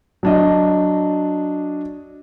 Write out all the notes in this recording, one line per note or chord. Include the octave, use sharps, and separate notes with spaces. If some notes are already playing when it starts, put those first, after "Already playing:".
F#3 D4 D#5